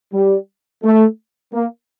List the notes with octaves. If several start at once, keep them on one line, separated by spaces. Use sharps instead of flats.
G3
A3
A#3